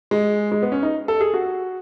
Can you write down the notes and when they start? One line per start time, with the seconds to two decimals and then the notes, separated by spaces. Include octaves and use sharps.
0.11 G#3
0.52 G#3
0.63 B3
0.72 C#4
0.83 D#4
1.08 A4
1.21 G#4
1.34 F#4